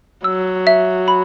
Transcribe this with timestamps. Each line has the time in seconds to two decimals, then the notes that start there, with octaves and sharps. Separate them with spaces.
0.24 F#3 E6
0.67 E5
1.08 B5